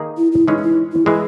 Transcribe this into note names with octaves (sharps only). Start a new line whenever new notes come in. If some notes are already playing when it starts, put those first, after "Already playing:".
Already playing: D#3 A#3 D#4 G#4
E4
E4
E3 G#3 C#4 D#4
D#4
E4
E4
E3 G#3 G#4